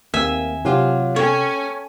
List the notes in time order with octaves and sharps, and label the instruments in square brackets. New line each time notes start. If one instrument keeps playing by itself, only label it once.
[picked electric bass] D#2 C4 [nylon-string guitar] A#3 [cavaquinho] E5 G#5
[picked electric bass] C3 [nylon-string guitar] F#3 F4 G4
[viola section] C#4 G#5 [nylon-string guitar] A4 G5 [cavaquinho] C#5